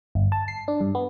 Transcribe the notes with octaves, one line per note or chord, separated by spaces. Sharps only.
G1
A5
C7
D4
G2
B3